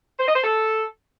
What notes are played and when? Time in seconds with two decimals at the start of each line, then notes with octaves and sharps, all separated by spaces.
0.19 C5
0.27 D#5
0.35 C5
0.44 A4